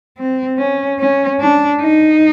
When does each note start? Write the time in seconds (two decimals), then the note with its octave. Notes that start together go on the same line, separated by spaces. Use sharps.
0.18 C4
0.59 C#4
0.99 C#4
1.40 D4
1.81 D#4